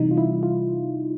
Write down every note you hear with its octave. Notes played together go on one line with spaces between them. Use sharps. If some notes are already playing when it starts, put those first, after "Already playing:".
Already playing: C3 E3 G3 D#4
F4
E4
F4